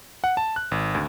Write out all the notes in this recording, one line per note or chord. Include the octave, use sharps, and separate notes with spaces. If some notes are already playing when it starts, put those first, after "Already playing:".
F#5
A5
F#6
G#1
D2